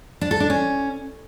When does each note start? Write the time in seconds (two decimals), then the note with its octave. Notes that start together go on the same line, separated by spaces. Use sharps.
0.21 D4
0.31 A4
0.40 D4
0.50 C#4